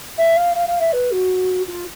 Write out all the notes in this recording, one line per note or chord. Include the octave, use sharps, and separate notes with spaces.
E5
F5
F5
F5
E5
B4
F#4
F4